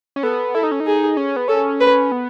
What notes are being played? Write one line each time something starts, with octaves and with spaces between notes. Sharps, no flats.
C#4
B3 A4
E4 A4
D#4
C#4
D#4
G#4
C#4
B3
C#4 A4
B4
B3